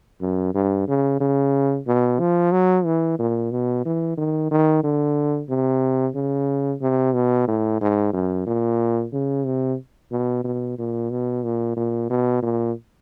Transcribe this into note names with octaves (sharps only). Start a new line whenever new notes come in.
F#2
G2
C#3
C#3
B2
F3
F#3
E3
A#2
B2
E3
D#3
D#3
D3
C3
C#3
C3
B2
A2
G#2
F#2
A#2
C#3
C3
B2
B2
A#2
B2
A#2
A#2
B2
A#2